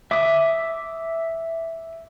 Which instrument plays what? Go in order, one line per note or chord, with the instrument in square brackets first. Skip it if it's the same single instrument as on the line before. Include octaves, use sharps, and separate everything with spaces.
[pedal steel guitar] E5 D6 D#6